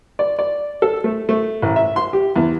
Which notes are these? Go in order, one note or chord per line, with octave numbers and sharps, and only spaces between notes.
D5
D5
A4
A3
A3
A1
E5
C6
G4
E2